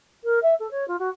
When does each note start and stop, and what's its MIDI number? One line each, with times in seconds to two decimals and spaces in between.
0.24 0.39 70
0.42 0.54 76
0.59 0.69 69
0.71 0.86 73
0.88 0.96 65
0.99 1.09 66